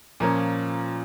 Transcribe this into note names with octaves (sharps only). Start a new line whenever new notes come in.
A#2 F3 A#3 C#4